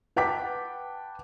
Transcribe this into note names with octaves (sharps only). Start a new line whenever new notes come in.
B4 F#5 G5 A5 D6 B6